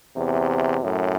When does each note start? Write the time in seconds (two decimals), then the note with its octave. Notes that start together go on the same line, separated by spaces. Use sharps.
0.17 E2 C3
0.84 F#2 A2